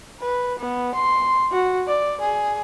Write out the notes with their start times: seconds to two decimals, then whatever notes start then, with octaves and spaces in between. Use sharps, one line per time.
0.20 B4
0.59 B3
0.95 C6
1.52 F#4
1.88 D5
2.21 G#4